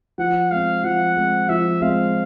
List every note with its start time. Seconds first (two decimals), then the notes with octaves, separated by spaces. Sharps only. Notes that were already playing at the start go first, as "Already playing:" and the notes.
0.18 F3 F#5
0.51 G#3 C4 F5
0.84 F3 F#5
1.17 G#3 C4
1.49 F3 E5
1.81 G#3 C4 F5